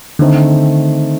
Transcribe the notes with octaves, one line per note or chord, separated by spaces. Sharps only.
D3 D#3 A3 C4 D#4